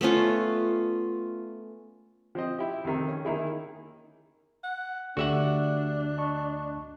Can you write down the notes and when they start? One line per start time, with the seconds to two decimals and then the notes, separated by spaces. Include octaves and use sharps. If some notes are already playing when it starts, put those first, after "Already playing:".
0.01 A3 B3 C#4 F4
2.35 F3 C4 D#5
2.58 E4 G4
2.84 F2 C3 D#3
3.08 C#4
3.25 D#3 A#3 D#4 E4 G#4
4.64 F#5
5.17 D2 A3 D4 F#4 G4 E5 F#5
6.18 D#5 A5 C#6